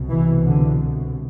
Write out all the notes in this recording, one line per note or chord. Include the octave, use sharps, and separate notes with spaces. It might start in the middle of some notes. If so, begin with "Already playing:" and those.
Already playing: C2 B2
E3
D3